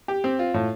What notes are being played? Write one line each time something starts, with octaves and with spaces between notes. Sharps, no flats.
G4
C4
F4
A2